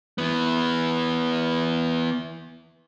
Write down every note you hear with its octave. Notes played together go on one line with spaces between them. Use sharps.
E3 B3